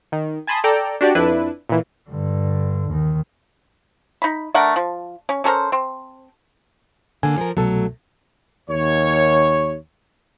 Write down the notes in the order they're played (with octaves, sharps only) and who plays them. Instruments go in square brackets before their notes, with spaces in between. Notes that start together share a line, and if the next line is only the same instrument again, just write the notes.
[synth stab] D#3
G#5 A5 B5 C6 D#6
A4 D5 G5 A#5
D4 F#4 G4 D5
F2 D4 E4 B4
A#2 E3
[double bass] G2 D3
D#2 D#3
[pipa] D#4 B5
A3 D4 A#4 F#5
F3
C#4
C#4 A4 A#4 C5
C4
[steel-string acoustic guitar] D3 A#3 [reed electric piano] G#5
[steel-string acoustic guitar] F3 A#4
[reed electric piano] C2 B2 A4 [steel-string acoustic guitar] F#3 A3
[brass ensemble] D#2 C#5